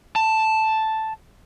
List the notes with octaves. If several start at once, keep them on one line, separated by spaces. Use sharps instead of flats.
A5